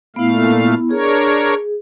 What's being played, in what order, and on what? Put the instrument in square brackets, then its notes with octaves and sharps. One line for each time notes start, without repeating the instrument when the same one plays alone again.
[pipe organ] A#2 A3 F5 [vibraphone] B3 E4
[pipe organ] D4 A#4 C#5 [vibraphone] G#4